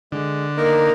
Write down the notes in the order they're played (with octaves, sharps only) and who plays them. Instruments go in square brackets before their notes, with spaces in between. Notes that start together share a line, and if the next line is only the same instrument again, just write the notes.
[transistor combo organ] D3 [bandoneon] G#3
[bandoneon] A#3 D#4 A#4